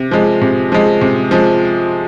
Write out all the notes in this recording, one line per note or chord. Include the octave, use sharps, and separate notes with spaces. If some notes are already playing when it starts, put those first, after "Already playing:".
Already playing: C3
F3 G#3
C3
F3 G#3
C3
F3 G#3